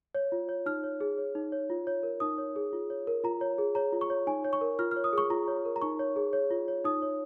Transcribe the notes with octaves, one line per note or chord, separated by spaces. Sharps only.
C#5
F4
C#5
D#4 F6
C#5
G#4
C#5
D#4
C#5
F4
C#5
A#4
D#4 D#6
C#5
G#4
F4
C#5
A#4
F4 A#5
C#5
G#4
C#5 A#5
F4
C#6
C#5
D#4 G#5
C#5
C#6
A#4
F4 F6
F6
C#5
D#6
G#4 C#6
F4 A#5
C#5
A#4
A#5
D#4 C#6
C#5
G#4
C#5
F4
C#5
D#4 D#6
C#5